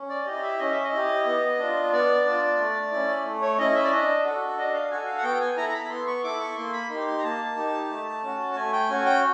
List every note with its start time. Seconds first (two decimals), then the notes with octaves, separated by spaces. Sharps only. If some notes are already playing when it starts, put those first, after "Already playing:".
Already playing: C#4
0.10 D5
0.26 E4 G4 D#5
0.43 E5
0.59 C#4 D#5
0.71 E5
0.84 D#5
0.93 E4 G4
1.26 B3
1.59 D4 F4
1.92 B3 D5
2.25 D4 F4
2.58 A3
2.91 C#4 E4
3.24 A3
3.41 C#5
3.58 C#4 E4 D#5
3.75 E5
3.84 D5
3.91 D4 D#5
4.24 F#4 A4
4.57 D4 D#5
4.74 F5
4.91 F#4 A4 G#5
5.07 F5
5.18 F#5
5.24 B3 G5
5.40 G#5
5.57 E4 A4 A#5
5.69 A#5
5.74 B5
5.86 B5
5.90 B3 C6
6.07 C#6
6.23 E4 A4 D6
6.40 C#6
6.56 A#3 C6
6.73 B5
6.90 D#4 G4 C6
7.07 C6
7.18 A#5
7.23 A#3 A5
7.56 D#4 G4
7.89 A3
8.23 C#4 F#4
8.52 A5
8.56 A3 G#5
8.73 G5
8.89 C#4 F#4 G#5
9.05 G5